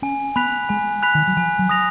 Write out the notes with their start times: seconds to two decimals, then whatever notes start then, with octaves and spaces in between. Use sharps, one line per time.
0.02 C#4 G#5
0.36 B3 B5 F#6 B6 F7
0.69 G#3 G#5
1.03 B5 F#6 B6 F7
1.15 D#3
1.27 F#3
1.37 F3 G#5
1.59 F#3
1.69 D#6 A#6 F7